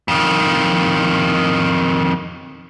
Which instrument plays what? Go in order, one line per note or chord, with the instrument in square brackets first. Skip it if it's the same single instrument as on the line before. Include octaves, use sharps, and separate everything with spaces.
[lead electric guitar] F2 D#3